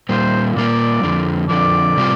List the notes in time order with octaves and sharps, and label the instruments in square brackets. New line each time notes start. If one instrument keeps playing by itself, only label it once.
[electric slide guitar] A#2 G3 A#3 F4 [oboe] C5
[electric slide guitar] A#2 G3 A#3 F4 [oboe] D5
[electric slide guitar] F2 D3 F3
[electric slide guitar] F2 D3 F3 [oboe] D5
[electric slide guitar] C3 G3 C4 F4